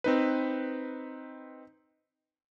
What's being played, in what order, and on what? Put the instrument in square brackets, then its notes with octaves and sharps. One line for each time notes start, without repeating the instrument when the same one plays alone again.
[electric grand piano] C4 D#4 B4